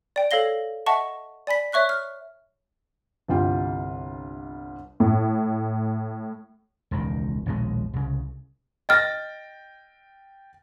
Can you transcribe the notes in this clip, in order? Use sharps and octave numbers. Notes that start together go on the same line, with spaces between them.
D5 G5
A4 C#5 F5 A#6 G7
D#5 E5 F#5 A5 C#6
D5 G#5 B5 B6
C#5 E5 C#6 F#6 B6
F6
G1 C2 F4 G5
A2
E1 C#2 D#3
A#1 D#2 B2 G#3
C2 C#3
D#5 G5 F6 A6 A#6